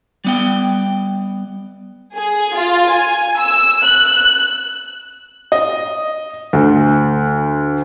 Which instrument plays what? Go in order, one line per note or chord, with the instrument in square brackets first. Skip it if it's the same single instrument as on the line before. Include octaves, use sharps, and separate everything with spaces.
[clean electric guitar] G3 B3 G5
[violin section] G#4
F4
G#5
E6
F#6
[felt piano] D#5
D2